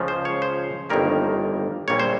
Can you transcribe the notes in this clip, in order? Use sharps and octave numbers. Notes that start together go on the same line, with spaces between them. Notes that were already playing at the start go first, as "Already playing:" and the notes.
Already playing: C#2 C#3 F3
C5
C#5
C5
G1 F2 D#3 G3 A#3 A#4
A#1 A#2 G3 A#3 C#5
C5